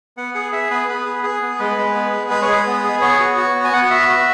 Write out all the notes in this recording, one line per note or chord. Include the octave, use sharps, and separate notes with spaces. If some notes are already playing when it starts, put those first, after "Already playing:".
B3 F#5
G#4 F#5
G#4 E5
B3 B4
B3 B4
G#4
G#4
B3
G#3 B4
G#3
B3
G#4
G#3 B4
C#5
G#3 B4
B3
G#4
B3 C#5
F#4
F#4
B3
G#5
B3 F#5
F#4 E5
F#4